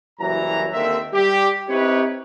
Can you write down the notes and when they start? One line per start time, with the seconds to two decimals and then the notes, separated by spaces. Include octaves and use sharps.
0.20 F#1 C2 E3 F#3 A#5
0.73 D#2 D3 D#3 A#3 C4 E5
1.14 G3 G4
1.69 C4 D#4 E4 G4 B4 C#5